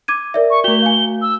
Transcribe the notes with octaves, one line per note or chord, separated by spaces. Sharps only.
D6 G#6 D#7
A#4 D5 E5
C#6
A3 F#4 G7
F5 G#5
E6